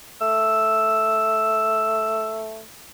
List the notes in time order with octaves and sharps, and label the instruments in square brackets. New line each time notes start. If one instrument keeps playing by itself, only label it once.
[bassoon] A3 [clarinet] E6